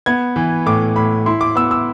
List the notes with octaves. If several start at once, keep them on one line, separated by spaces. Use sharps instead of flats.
B3 G#6
E3
A2 D6
A2 B5
E4 C6
D6
B3 E6
E6